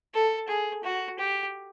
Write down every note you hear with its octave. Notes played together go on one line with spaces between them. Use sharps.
A4
G#4
F#4
G4